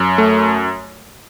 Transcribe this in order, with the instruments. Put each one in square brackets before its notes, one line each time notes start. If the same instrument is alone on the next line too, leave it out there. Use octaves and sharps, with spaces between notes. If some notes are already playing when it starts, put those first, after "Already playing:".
Already playing: [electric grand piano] F#2
A3